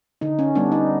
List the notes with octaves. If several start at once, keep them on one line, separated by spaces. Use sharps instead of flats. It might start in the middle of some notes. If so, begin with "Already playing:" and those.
D3 D#4
C#4
G3 B3 D4
D#4